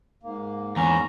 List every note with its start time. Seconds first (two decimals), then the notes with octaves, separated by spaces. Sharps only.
0.23 G#2 A#3
0.76 E2 C#4 A#5